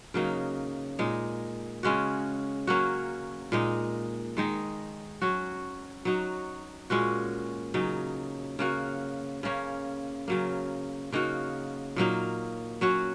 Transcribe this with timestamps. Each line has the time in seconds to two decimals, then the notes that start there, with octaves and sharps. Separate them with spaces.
0.14 C#3 F#3 A#3 D#4
0.99 A#2 G#3 D#4
1.83 C#3 G#3 C#4 F#4
2.67 F#3 A#3 C#4 F#4
3.52 A#2 G#3 D#4
4.37 D#3 G#3 D#4
5.22 F#3 C#4 F#4
6.05 F#3 D#4 F#4
6.90 A#2 G#3 C#4 F#4
7.74 C#3 F#3 D#4
8.59 C#3 A#3 F#4
9.43 C#3 A#3 C#4
10.28 C#3 F#3 A#3
11.12 C#3 A#3 D#4 F#4
11.96 A#2 F#3 A#3 D#4
12.81 F#3 C#4 F#4